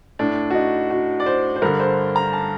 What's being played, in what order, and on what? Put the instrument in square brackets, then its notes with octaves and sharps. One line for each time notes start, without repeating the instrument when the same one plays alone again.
[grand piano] A2 D4
F#4
D#4
F#4
D5
C5
C5
G2 D3 A#4
C5
A#5
A5